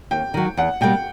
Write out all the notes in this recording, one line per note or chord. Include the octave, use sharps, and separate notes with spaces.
D#2 G5
D#3 F#3
E2 F#5
B2 G3 A#3 G5